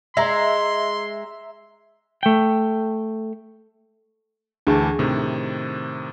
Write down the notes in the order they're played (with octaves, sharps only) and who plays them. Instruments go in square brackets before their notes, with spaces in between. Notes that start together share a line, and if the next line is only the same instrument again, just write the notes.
[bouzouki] G#3 [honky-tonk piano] E5 A#5 [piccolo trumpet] C6
[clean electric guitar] A3 G5
[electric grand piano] D2 E3 A5 [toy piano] D4 G#4 C#6
[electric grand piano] A2 C3 D#3